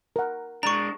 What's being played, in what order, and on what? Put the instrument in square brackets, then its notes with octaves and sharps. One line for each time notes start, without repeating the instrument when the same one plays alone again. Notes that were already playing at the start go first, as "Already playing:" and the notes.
[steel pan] A#4 F#5
[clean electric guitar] G#3 D4 [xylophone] A#5 C#6